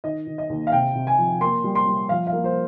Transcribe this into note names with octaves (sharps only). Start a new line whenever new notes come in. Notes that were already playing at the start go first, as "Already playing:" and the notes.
D#3 D#5
D#3
D#5
D#2
F5
C3 G5
C3
G#5
F3
A#3 C6
G3
C6
G3
F3 F5
F5
A#3
C5